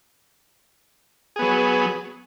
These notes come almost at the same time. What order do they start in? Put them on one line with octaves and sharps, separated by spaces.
G#4 B3 F#3